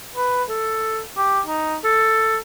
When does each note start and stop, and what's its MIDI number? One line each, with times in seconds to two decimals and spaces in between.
0.15 0.43 71
0.49 1.01 69
1.17 1.41 67
1.46 1.77 63
1.84 2.38 69